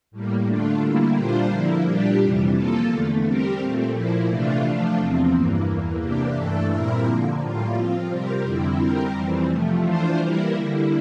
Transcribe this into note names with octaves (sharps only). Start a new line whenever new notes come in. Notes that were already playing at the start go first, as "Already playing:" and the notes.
A2 G3 A#3
D3 A3 D4 F4
D3 G3 A#3 E4
A#2 G3 D4 F4 C5
D3 F3 A#3 E4
A#2 G3 D4 G4
F2 C3 E3 G3
F3 A#3 F4 A4
E2 D3 A3
G3 C4 G4 A#4
A#2 A3 C4
A#2 F3 A#3 E4
C3 E3 A3 D4 F4
F3 A3 D4 F4
E2 C3 F3 C4
G2 E3 A#3
E2 E3 A#3
C3 E3 A#3 D4 G4
G2 E3 A3 D4 A4
A#2 G3 C4 E4 A#4
D3 F3 A#3
A2 G3 A#3 F4
F3 C4 F4
C3 G3 C4 G4 A#4
F2 D3 G3 C4 E4
G3 C4 G4 A#4
F2 E3 G3 C4
C3 F3 A3
E3 A3 D4 F4 C5
E3 G3 A#3 E4 A#4
D3 G3 A#3 E4